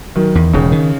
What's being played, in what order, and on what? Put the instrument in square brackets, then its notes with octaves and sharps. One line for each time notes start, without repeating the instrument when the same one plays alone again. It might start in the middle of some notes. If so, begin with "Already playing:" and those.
[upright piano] D#3 [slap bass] F#3
[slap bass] E2
[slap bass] E1 [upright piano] C#3
[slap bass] D#3